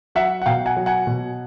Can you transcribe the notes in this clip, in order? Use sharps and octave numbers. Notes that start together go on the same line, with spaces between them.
F#3 E5 F#5
F#5
B2 F5 G5
F#5 G#5
F#3
F#5 G#5
B2